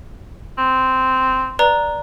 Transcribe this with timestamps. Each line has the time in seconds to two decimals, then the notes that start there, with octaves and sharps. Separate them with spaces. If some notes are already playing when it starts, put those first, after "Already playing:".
0.58 C4
1.59 B4 D5 A#5